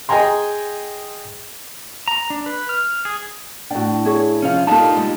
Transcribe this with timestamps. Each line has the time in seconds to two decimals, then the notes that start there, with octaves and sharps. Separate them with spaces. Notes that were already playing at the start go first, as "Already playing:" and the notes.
0.09 G#4 D#5 G5 G#5 A#5 C6
2.08 A#5
2.30 D4
2.46 B4
2.69 F6
3.05 G#4
3.71 A2 D4 F#4 G5
4.05 E4 G#4 C#5
4.42 C3 F3 C#4 F5
4.67 G3 A#3 D#4 F4 G4 A4 F5 A5
4.97 G#3